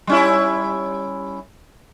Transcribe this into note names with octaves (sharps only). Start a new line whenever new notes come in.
G3 C#4 E4